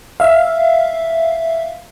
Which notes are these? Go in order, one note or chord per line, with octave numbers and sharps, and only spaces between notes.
E5 F5